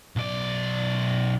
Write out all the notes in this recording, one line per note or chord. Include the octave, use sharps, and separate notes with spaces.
B1 D5